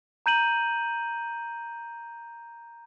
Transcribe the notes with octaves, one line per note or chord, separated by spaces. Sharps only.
A#5 G6 D#7 F#7